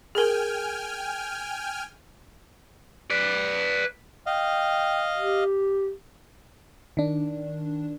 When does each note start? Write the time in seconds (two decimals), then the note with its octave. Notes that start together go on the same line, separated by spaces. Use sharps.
0.15 G#4 A#4 G5 G#5 F6
3.10 B4 D5
4.26 D#5 F5 G5
5.17 G4
6.97 D#3 D4